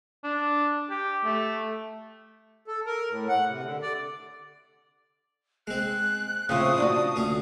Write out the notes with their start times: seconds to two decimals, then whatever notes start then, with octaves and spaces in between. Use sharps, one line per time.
0.24 D4
0.90 G4
1.24 A3
2.67 A4
2.86 A#4
3.09 A2
3.28 F#5
3.47 C3
3.63 D3
3.82 D5
5.67 G#3 C4 F#6
6.49 A2 C#3 F3 C4 C#4 D#6
6.78 D4 D#4 F#4
7.16 D2 C#4